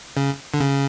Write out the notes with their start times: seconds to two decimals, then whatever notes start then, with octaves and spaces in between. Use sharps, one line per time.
0.17 C#3
0.54 D3
0.60 C#3